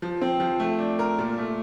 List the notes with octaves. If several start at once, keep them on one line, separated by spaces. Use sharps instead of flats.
F3
C4
F3
A3
D4
A#4
A#2
A3